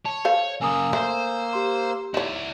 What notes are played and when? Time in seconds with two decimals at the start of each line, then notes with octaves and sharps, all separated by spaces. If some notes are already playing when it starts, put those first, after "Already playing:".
0.05 C#5 A5
0.25 A4 C5 F5
0.61 C#3 F#3 A#3 G#5 D#6 E6
0.93 A3 C5
1.53 G4 C6
2.14 D#4 E4 C#5 D5